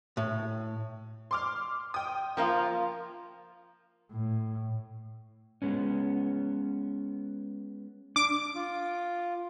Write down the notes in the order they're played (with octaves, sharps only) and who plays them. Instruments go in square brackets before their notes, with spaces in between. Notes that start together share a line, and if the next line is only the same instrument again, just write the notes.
[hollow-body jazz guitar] A2
[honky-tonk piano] C6 D6 F6
G5 D#6
[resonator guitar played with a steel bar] F3 A#3 F4
[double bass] A2
[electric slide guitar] G#3 B3 C#4
[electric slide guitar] D4 [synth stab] D6
[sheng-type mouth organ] F4